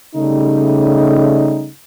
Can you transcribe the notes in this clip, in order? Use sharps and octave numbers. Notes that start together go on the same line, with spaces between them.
C#3 G3 A3 D#4